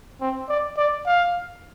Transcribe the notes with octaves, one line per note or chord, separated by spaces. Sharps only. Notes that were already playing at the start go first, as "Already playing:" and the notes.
C4
D5
D5
F5